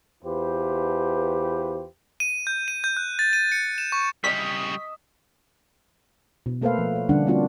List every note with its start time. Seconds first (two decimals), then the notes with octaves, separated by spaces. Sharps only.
0.24 E2 F4 G4 B4 C5
2.20 D#7
2.47 G6
2.68 D#7
2.84 G6
2.97 F#6
3.19 A6
3.33 D#7
3.52 C#7
3.78 E7
3.92 C#6
4.24 C#3 G3 D#5 E5 C#6 B6
6.46 B2
6.62 A3 A#3 A4 B4 C5 F5
6.78 F3
6.96 C#5
7.09 D3 G3 C#4 D4 F#5
7.27 G3 A#3 C4 D4 F4 F#4